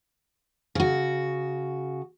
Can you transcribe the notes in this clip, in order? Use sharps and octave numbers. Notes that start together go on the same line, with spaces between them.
C#3 F#4